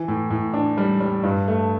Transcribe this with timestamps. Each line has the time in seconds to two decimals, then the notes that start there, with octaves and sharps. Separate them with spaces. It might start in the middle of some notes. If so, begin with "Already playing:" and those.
Already playing: E3
0.08 A2
0.30 A2
0.54 D4
0.78 G3
1.01 G3
1.23 G2
1.48 A3